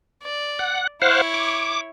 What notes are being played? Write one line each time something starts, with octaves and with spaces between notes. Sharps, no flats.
D5
F#5
E4 C5 C#5 F5 F#5
D6